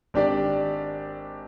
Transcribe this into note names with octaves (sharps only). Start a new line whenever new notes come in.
G#1 D4 G4 D5